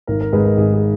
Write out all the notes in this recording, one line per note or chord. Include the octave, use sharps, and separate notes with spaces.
G#1 A#4
A#4
G#2 D#3 G#3 G#4 B4
A#4
G#1 G#4
G#4